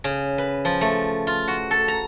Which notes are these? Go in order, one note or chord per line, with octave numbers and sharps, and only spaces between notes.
C#3
B4
F3
A3
F4
F#4
A4
A#5